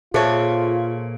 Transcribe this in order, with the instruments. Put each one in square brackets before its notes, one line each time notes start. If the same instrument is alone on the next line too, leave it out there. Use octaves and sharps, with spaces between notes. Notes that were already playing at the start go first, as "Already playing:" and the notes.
[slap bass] A#2 [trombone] F4 [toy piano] G#4 C5 E5 [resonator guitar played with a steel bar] A4 C#5